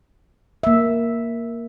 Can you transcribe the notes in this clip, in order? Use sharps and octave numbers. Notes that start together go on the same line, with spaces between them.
A#3 E5